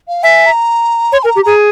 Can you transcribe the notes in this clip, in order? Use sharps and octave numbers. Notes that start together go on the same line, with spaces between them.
F5
E5 G#5
A#5
C#5 C6
A#4 G#5
A#5
G4
G#4 A#5